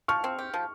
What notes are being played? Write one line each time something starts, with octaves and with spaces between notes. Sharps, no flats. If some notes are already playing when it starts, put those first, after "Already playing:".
F3 C#6 F6
C4
G4
F3